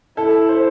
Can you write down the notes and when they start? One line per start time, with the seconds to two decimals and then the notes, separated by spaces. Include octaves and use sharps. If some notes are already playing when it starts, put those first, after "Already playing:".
0.17 E4 A4
0.49 C5